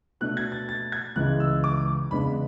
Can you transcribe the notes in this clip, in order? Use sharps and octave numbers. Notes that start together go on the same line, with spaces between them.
B2 A3 D4 F#6
G#6
A6
A6
G#6
C#2 C#3 E3 G#3 F#6
E6
D6
D6
E2 C#3 G#3 B3 D4 B5